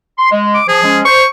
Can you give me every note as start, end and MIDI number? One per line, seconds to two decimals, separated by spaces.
0.18 0.30 84
0.31 0.59 56
0.54 0.64 86
0.68 0.82 53
0.68 1.00 68
0.84 1.03 53
0.84 1.03 56
0.84 1.03 61
1.05 1.24 72
1.05 1.26 85